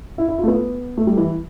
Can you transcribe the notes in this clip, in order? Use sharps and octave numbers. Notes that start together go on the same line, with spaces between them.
E4
E4
F4
A3
B3
A3
G3
E3